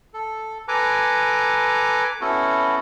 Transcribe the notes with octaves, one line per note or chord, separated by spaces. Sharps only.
A4
A4 B4 G#5 A#5 D6
B3 C#4 E4 F#4 A4